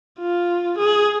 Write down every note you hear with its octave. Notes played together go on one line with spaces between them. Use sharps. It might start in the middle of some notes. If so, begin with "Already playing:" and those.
F4
G#4